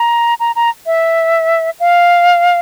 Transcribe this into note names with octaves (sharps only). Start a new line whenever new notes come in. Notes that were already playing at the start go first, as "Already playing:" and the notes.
Already playing: A#5
A#5
A#5
E5
F5